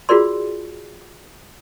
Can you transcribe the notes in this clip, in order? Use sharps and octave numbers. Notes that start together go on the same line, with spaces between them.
F4 F#4 G#4 A#4 D5 C6